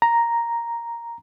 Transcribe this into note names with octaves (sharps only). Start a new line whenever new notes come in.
A#5